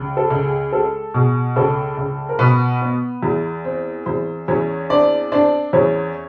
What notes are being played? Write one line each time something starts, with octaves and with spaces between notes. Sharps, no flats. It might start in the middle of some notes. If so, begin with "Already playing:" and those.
Already playing: C#2
A4
C#2
G#4
G#3 A4
B2 G#4
C#2 A4
C#2
A#4
B2 B3 B4
B3
E2
C4
E2 C4 C5
E2 C#4 C#5
C4 D4 D5
C4 D4 D5
E2 C#4 C#5